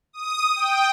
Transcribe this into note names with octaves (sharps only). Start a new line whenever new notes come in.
D#6
G5